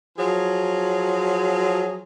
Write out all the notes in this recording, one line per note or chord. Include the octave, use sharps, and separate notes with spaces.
F3 F#3 G#4